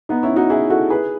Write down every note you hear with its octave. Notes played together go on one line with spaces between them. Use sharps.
B3 D#4
C#4 E4
D#4 F#4
E4 G#4
F#4 A4
G#4 B4